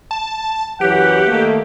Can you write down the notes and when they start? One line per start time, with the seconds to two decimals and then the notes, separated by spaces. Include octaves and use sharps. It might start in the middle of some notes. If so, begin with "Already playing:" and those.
0.11 A5
0.81 F#2 E3 F#3 G4 F#5
1.27 D#3 A3 A#3